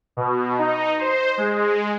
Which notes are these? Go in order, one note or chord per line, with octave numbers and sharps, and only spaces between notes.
B2
D#4
C5
G#3